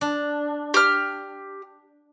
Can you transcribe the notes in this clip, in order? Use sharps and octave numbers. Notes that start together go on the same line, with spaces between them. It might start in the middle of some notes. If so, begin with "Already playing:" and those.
D4
G4 F6